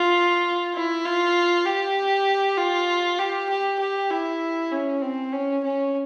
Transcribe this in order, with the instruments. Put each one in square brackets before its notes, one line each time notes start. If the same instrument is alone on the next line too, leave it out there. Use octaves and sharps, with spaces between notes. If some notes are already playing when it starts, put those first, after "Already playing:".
Already playing: [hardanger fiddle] F4
E4
F4
G4
F4
G4
G4
G4
E4
C#4
C4
C#4
C#4